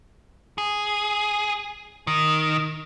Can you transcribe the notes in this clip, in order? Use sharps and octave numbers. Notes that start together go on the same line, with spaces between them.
G#4
D#3